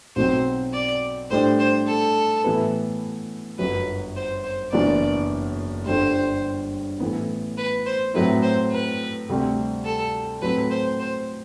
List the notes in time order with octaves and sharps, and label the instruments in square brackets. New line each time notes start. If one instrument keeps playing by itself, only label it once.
[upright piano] B1 B2 F#3 C4 [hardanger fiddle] C5
[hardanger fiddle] D5
[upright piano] A2 G3 D4 [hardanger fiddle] C5
[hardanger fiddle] C5
A4
[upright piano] A2 E3 B3 E4 B4
[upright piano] G1 F#2 F#3 [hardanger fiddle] B4
[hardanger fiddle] C5
C5
[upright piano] F#1 F#2 E3 B3 D4 [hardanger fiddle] D5
[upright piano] G1 G2 D3 G3 [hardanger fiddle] C5
[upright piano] A1 A2 E3 B3
[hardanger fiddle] B4
C5
[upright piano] A2 F#3 A3 C4 E4 [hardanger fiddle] B4
[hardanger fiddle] C5
B4
[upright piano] D2 C3 G3 C4
[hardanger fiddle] A4
[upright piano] A2 F#3 C4 [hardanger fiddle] B4
[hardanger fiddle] C5
C5